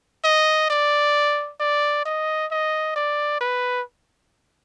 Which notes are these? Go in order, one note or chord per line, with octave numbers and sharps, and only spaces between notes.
D#5
D5
D5
D#5
D#5
D5
B4